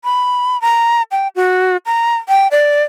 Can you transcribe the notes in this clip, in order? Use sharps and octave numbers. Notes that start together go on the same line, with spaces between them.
B5
A#5
G5
F#4
A#5
G5
D5